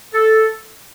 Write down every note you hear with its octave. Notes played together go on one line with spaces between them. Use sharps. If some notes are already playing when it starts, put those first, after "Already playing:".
A4